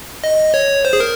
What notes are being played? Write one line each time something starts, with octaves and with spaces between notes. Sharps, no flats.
D#5
C#5
C5
G#4
A#4